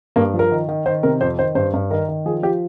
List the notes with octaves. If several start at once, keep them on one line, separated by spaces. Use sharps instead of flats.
G2 A#3
F3
A#4
D#3
D#3
D#3 C5
C3 A#4
F2 C5
D#3 C5
G2 C5
G2
D#3 A#4
D#3
F3 G#4
F3 G4